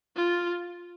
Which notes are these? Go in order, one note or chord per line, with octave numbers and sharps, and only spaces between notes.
F4